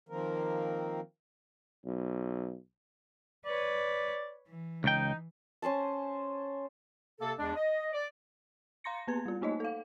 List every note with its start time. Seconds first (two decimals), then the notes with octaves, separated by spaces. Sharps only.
0.09 D#3 F3 A#3 C4 A#4
1.85 B1
3.46 B4 C#5 D5
4.48 E3
4.84 C#2 D#4 G5
5.62 C#4 C5 G#5 A5
7.20 C3 A#3 A4
7.39 E2 G#3 D4
7.55 D#5
7.93 D5
8.84 F5 A#5 C6 A#6 C#7
9.07 A#3 B3 B4 G#6
9.26 G3 F4
9.41 A3 A#3 D#4 C#5 D#5
9.60 A4 F5